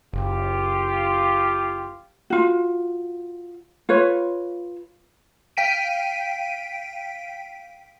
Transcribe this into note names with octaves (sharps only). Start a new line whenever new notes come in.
F#1 F4 G4
F4 F#4
F4 B4 C#5
F5 G5 B6 D7 D#7